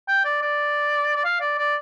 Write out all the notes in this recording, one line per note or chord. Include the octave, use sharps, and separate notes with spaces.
G5
D5
D5
D5
F5
D5
D5